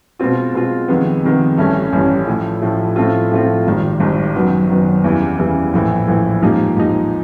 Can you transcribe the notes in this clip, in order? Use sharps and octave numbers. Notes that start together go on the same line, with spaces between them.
B2 G#3 C4 F4
B2 G#3 C4 F4
F2 C3 D#3 G#3 B3
F2 C3 D#3 G#3 B3
A1 G2 E3 A3 C#4
A1 G2 E3 A3 C#4
A2 F3 A3
A2 F3 A3
A2 F3 A3 C4 F4
A2 F3 A3 C4 F4
G#1 G#2 D#3 G3
G#1 G#2 D#3 G3
F#2 D#3 F#3 B3
F#2 D#3 F#3 B3
E2 C#3 E3 G3
E2 C#3 E3 G3
A#1 A2 E3
A#1 A2 E3
G#2 F3 A#3 D#4 G4
G#2 F3 A#3 D#4 G4